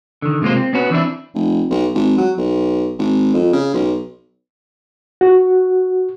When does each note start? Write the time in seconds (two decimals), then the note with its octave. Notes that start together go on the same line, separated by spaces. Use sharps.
0.22 D3 D#3
0.42 C3 G#3 A#3 F4 C5
0.57 C4
0.73 B3 C#4 F#4 A#4 B4
0.90 E3 C4 D4 E4
1.35 F1
1.70 B1
1.95 G#1
2.18 F#3
2.38 B1
2.98 G#1
3.34 F2
3.53 C#3
3.74 B1
5.21 F#4